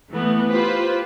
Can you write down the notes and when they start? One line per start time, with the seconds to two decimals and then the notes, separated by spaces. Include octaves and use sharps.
0.11 E3 A3 B3
0.51 F4 G4 B4 C5